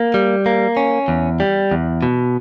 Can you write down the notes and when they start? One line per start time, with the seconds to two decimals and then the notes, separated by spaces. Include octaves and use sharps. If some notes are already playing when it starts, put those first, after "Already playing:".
Already playing: A#3
0.14 G3
0.46 A#3
0.77 C#4
1.08 E2
1.40 G3
1.71 E2
2.03 B2